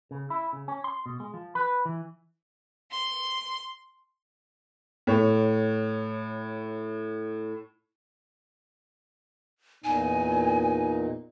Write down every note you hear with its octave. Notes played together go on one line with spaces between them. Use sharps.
C#3
E4
C#3
C#4
C6
B2
G#3
F3
B4
E3
C6
A2 C#5
E2 A#2 D#4 G#5